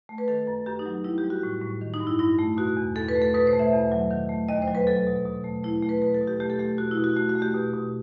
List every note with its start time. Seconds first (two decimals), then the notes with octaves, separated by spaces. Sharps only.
0.09 A3
0.18 B4
0.28 D#3 A4
0.47 F#2
0.66 F#2 G4
0.79 D#4
0.86 F#3
1.04 G3 E4
1.18 G4
1.23 G3
1.30 F#4
1.43 A2
1.62 A2
1.81 D#3
1.94 D#4
2.00 G2
2.07 E4
2.19 G2 E4
2.39 A3
2.57 B2 F#4
2.77 E2
2.96 E2 A4
3.08 B4
3.16 A3
3.22 A4
3.34 B2 B4
3.47 C5
3.53 A3
3.59 E5
3.73 E2
3.92 F#3
4.11 D#3
4.29 A3
4.49 D#2 D#5
4.62 C5
4.67 F#3
4.75 B4
4.87 F#3 A4
5.06 B2
5.25 B2
5.44 A3
5.64 A3 E4
5.83 A3
5.89 B4
6.02 B2 B4
6.14 A4
6.21 B2
6.27 G4
6.40 A3 G4
6.50 A4
6.59 A3 G4
6.78 B2 F#4
6.91 E4
6.97 B2
7.04 F#4
7.16 A3 F#4
7.29 F#4
7.35 A3
7.42 G4
7.54 B2
7.74 B2